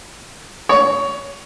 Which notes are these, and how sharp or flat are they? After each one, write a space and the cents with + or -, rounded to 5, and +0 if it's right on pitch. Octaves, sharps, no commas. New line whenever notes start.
C#5 +15